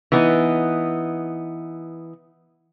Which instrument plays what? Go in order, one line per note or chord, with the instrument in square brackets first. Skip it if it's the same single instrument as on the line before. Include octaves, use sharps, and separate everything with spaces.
[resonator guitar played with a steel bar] E3 B3 D#4